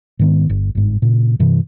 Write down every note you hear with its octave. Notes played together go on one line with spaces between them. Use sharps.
G#2 D#3 B3
G1
G1 G#2
A#2 C#3
G2 C3 E3